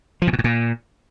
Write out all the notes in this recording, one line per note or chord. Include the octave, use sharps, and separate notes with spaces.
F3
A#2
B2
A2
A#2